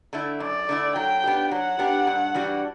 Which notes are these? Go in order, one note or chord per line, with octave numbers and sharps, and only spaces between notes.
D3 A3 E4
F#2 D5
D3 A3 E4
F#3 G5
B3 D4 G4
F#3 F#5
B3 D4 G4
G2
E3 G3 D4 F#4